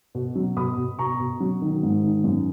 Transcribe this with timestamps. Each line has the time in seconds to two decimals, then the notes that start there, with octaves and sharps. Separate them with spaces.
0.15 B2
0.35 F#3
0.57 B2 B5 D#6
0.77 B2
0.99 B2 A#5 C#6
1.20 B2
1.40 F#3
1.61 D#3
1.83 G#2
2.03 D#3
2.24 F#2